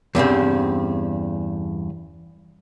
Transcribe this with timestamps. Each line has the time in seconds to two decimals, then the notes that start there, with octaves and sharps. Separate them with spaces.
0.15 E2 G2 C#3 C4